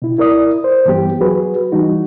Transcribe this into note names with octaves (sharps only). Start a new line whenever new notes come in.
B2 E4
E4 A#4 D5 D#6
C5
G2 E3 G3 B3 G4
F#3 F#4 G#4 B4
E3 G3 D#4 F#4